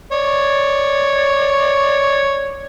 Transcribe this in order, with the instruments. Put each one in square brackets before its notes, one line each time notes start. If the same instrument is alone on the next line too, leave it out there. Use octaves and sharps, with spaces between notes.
[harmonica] C#5 D5